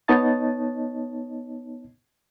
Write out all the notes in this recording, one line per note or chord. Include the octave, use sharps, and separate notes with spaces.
B3 D#4 C#5 D#5 A5 A6